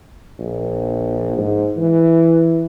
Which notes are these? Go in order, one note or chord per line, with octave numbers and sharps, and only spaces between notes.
A#1
G#2
E3